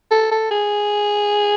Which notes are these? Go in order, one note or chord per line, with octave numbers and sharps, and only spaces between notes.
A4
A4
G#4